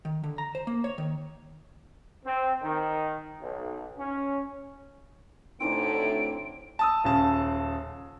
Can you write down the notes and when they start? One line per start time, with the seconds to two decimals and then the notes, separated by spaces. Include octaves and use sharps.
0.05 D#3
0.24 D3
0.38 A#5
0.55 C5
0.67 A#3
0.84 C#5
0.98 D#3
2.25 C4
2.62 D#3
3.40 B1
3.96 C#4
5.60 D2 A2 D3 E3 C4 D#4 D7
6.79 A5 D#6 E6
7.04 D#1 C#3 A5